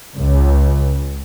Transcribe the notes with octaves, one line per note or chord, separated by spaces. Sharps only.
C#2